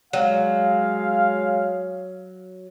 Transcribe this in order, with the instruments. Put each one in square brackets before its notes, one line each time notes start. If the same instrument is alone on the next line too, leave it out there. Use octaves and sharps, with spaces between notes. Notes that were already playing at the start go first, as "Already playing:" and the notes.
[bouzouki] F#3 [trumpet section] G#3 F5